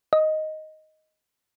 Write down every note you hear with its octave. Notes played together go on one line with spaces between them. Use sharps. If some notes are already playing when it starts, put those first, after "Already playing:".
D#5